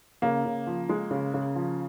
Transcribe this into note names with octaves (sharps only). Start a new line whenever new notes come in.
C#3 A#3
C#3
F3
G#3
C#3
C#3
F3